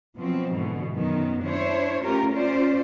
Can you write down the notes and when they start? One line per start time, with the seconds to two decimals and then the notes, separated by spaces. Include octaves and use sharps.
0.17 B2 F3 F#3 C4
0.55 G#2 B2 D3 E3
0.92 F#2 D#3 B3
1.43 D4 E4 C5 C#5
2.03 A3 C#4 F4 G4 A#4
2.32 C#4 F4 C5 D5